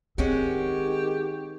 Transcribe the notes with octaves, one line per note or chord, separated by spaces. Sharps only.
D#3 G#3 C4 C#4 F#4 G4